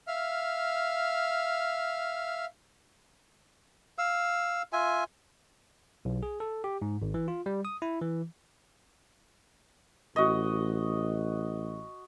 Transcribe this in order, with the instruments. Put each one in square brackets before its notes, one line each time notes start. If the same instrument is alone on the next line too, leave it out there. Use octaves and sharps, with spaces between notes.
[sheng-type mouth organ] E5 F5 F6
[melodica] F5 E6
F4 E5 G#5
[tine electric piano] B1
G#4
A4
G4
G#2
G#1
E3
F4
G3
D#6
E4
E3
[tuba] A1 [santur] F#4 D#5